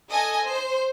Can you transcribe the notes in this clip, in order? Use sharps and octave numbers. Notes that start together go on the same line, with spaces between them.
A4 D#5 G#5
C5